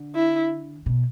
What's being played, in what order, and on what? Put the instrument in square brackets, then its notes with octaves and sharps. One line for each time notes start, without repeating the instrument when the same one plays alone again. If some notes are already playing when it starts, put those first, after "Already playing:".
Already playing: [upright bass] D3
[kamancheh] E4
[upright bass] B2